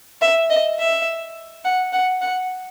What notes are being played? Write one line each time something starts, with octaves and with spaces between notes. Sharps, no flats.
E5
D#5
E5
F#5
F#5
F#5